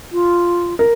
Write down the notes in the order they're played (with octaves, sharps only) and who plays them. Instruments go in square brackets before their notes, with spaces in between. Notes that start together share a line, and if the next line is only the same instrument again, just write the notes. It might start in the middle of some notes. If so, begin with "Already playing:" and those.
[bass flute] F4
[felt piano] A#4